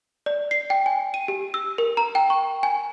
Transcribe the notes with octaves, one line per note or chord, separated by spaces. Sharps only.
D5
C7
G5
G#5
D#7
G4
E6
A#4
A#5
G5
C#6
G#5